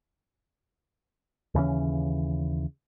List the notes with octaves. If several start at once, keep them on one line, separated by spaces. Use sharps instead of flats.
D#2 C#3 E3 C#4